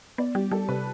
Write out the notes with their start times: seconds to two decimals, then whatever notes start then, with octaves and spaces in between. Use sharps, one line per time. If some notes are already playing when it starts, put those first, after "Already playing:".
0.18 B3 D5
0.35 G3 G4
0.51 G3 A4
0.68 C3 B4